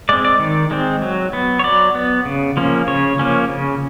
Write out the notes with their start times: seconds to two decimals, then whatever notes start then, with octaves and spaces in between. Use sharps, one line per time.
0.09 G#3 C4 D5
0.25 D5
0.40 D#3
0.71 G#3 C4
1.02 F#3
1.33 B3
1.59 C#5
1.64 F#3 D5
1.95 B3
2.25 C#3
2.57 F3 A#3 C#4
2.88 C#3 C#5
3.19 F3 A#3 C#4
3.49 C#3